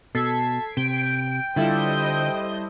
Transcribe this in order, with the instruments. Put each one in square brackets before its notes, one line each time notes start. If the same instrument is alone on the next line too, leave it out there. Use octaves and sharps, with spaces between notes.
[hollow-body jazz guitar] B2 [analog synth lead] A4 [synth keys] G#6 B6 C7
[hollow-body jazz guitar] C3 [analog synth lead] G5 [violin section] D7
[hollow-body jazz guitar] D3 F4 [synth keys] G3 E4 A4 [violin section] C5 D#5 G6